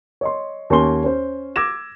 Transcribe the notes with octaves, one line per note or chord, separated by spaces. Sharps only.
C#5 D#5 C6
D#2 C#4 G#5 C6 G7
C#4 C5
D6 E6 G#6 A#6 E7